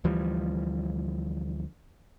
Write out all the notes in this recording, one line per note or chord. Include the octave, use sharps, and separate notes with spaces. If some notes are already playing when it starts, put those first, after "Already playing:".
D2 E3 F3 G3